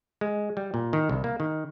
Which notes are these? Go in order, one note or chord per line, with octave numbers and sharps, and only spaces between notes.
G#3
G3
A#2
D#3
C2
A#3
D#3